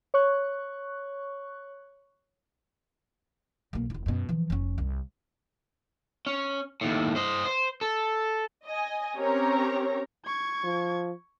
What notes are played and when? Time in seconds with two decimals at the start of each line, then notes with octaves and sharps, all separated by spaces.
0.14 C#5 C#6 F#6
3.73 B1 A#3
3.90 F1 E4
4.06 F#2 B2
4.29 E3 F3
4.50 F1 C#4
4.78 C2
6.26 C#4
6.81 D#2 A2
7.16 C5 D#5
7.45 C5
7.81 A4
8.66 D#5 G#5
9.16 C4 C#4 G4 A#4 C#5 A#5
10.26 C#6 G#6
10.64 F3